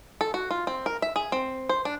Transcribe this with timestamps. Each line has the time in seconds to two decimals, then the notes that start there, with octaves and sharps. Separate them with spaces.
0.21 A4
0.34 F#4
0.51 F4
0.67 C4
0.86 A#4
1.02 E5
1.16 G#4
1.32 C4
1.69 C5
1.85 D4